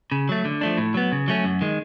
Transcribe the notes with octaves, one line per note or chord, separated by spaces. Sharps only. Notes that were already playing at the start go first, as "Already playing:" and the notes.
C#3
F#3 A3
D3
F3 A3 D4
A2
F#3 B3
C#3
F#3 A3 C#4
F#2
D#3 G#3